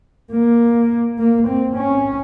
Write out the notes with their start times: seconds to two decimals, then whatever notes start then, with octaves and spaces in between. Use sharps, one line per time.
0.31 A#3
1.18 A#3
1.47 C4
1.76 C#4